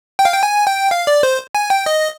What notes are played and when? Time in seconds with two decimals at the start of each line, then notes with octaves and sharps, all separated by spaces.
0.19 G5
0.25 F5
0.33 G5
0.43 G#5
0.67 G5
0.91 F5
1.07 D5
1.23 C5
1.55 G#5
1.70 G5
1.86 D#5